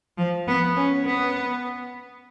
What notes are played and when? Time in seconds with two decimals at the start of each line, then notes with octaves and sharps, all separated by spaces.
0.18 F3
0.48 B3
0.76 C#4
1.05 B3